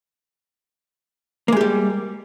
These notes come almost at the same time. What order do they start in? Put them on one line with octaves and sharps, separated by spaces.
A#3 G#3 G4 G3